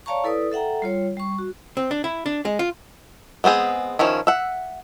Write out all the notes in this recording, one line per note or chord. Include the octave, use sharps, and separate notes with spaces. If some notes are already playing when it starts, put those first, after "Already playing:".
C#5 D5 F5 A5 A#5 C#6
E4 A4 B4 D5 D#6
A4 E5 F#5 G5 A#5
G3 F4 C#5
G3 C#6
F#4
C4
D4
E4
D4
G#3
F4
G#3 B3 C4 G#4
D#3 F3 C#4 E4
E5 F#5